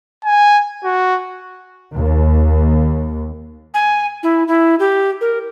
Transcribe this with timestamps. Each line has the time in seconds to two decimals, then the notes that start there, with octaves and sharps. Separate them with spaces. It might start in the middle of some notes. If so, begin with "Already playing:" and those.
0.25 G#5
0.84 F#4
1.94 D#2
3.74 G#5
4.23 E4
4.48 E4
4.79 G4
5.21 A#4